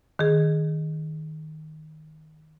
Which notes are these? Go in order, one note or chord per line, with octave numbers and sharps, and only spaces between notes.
D#3 G#4